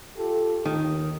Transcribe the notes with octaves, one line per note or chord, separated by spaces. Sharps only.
F4 G4 A4
D#2 D#3